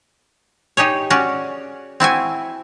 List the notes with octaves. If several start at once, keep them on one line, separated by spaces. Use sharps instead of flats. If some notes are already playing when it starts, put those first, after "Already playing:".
D#4 G4 G#4 C#5
C#4 F#4 D5
C4 E4 F#4 G#5